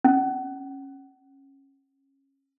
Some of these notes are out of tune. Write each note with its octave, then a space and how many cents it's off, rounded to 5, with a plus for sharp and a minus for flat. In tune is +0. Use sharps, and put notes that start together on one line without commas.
C#4 -25